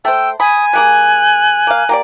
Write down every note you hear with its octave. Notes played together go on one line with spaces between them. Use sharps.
A3 C5 G5 E6
G#5 B5 D#6
G3 A#3 G#4 F#6
A#3 F5
A#3 G4 D5